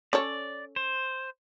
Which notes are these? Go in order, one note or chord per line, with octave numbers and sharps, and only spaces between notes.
C#4 A4 C#5 D5
C5